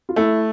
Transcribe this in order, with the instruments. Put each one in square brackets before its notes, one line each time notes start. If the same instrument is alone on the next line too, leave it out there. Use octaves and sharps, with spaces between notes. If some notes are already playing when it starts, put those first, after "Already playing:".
[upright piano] F4
[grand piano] A3 [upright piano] E4